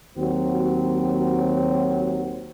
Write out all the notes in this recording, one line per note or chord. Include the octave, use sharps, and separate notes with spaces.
D#2 F#3 C4 F#4